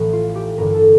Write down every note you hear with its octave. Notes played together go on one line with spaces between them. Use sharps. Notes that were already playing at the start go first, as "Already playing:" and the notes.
Already playing: A1 A2 E3
F4
G4
A1 G2 D3 A#4
A4